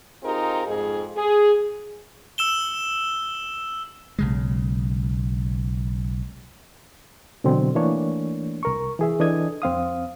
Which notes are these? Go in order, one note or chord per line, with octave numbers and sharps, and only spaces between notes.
C4 D#4 F4 G4 G#4 A#4
F2 G#2 G#4
G#4
E6 E7 G7
B1 C#3 G#3
B2 D3 E3 F#3 C4
E3 A3 A#3 D4 C#5
C2 A#4 C#6
E3 G#4 E5
E3 D4 A4 D#5 D#6 G#6
F2 C4 F5 D#6